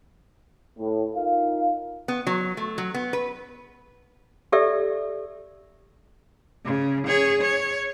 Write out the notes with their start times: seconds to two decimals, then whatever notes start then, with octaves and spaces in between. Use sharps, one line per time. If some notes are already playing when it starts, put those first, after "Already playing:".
0.78 A2
1.15 D#4 F4 A#4 F5
2.08 B3
2.27 F#3
2.57 A3
2.78 F#3
2.94 B3
3.13 B4
4.52 G4 A4 D5 E5 E6
6.65 C#3
7.07 G#4 C#5
7.41 C#5